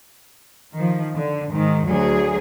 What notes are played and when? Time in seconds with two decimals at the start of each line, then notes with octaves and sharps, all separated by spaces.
0.75 D#3 F3
1.16 D3
1.50 G#2 D#3
1.85 D2 F#3 G#4